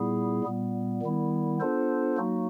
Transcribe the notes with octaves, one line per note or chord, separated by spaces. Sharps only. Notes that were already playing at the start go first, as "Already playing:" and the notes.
Already playing: A#2 G3 B3 E4 G#4
A#2 G3 B3
D#3 G3 B3 E4
B3 D4 F4 A4 C5
F#3 A#3 D#4 F#4